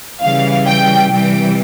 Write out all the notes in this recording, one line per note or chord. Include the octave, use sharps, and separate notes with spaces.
C#3 E3 G3 F5
G5
C3 E3 G3 G5